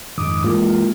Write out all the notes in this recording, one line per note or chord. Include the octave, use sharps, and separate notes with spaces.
F2 G#2 D#3 D6 D#6
E3 G#3 A#3 F4